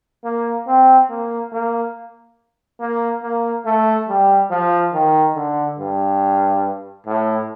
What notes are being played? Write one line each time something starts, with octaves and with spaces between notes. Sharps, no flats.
A#3
C4
A#3
A#3
A#3
A#3
A3
G3
F3
D#3
D3
G2
A2